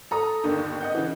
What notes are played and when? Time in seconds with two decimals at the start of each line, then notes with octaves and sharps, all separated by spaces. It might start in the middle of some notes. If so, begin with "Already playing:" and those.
0.11 A4 A#5 D#6
0.44 G1 D#2 D3
0.81 D#5 F#5 G6
0.95 C#3 E3